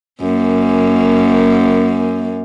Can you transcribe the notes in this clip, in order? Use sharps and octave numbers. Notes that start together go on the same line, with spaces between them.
F#2 A#3